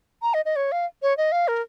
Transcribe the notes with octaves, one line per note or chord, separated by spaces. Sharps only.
A#5
D#5
D#5
C#5
F5
C#5
D#5
F5
A#4